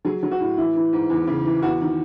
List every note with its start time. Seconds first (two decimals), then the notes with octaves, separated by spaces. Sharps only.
0.05 F#3 G#4
0.23 F#3
0.31 F#4
0.40 A2
0.57 E3 E4
0.76 E3
0.93 G#2
1.10 E2
1.27 C#3
1.45 E3
1.62 E2 F#4
1.81 D#3